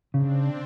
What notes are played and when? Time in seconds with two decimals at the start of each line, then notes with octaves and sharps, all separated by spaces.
0.14 C#3 C4 D4